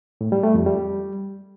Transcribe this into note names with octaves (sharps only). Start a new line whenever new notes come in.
A2
G3
A3
F2
G3